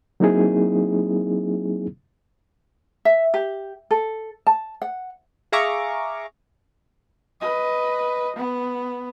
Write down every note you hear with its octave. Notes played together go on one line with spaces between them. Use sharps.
F#3 A#3 C4 D#4 E4 G#4
E5
G4
A4
A5
F#5
G#4 E5 F5 A#5 C#6 D6
B4 D#5
B3